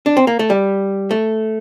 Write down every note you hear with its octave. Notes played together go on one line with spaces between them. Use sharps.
D4
C4
A#3
A3
G3
A3